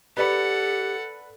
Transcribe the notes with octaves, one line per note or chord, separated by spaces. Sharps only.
G4 A4 B4 D5 F#5 B5